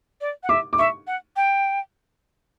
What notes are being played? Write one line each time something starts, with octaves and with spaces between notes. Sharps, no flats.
D5
F#5
E5 D6
D6
E5 C#6
F#5
G5